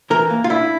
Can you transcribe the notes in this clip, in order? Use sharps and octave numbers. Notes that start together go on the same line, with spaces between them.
E3 A#4
A#3
F4
D4 E4